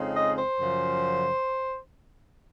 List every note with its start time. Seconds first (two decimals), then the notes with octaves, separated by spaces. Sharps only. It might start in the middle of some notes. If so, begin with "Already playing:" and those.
Already playing: F2 C#3 G#3 C4 D#4
0.15 D#5
0.37 C5
0.59 F#2 C#3 F3